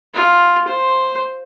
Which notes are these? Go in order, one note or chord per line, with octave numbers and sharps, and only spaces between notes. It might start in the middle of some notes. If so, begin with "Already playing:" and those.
F4
C5